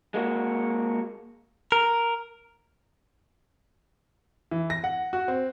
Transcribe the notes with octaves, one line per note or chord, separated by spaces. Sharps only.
G#3 A#3 F#4
A#4
E3
A#6
F#5
F#4
C4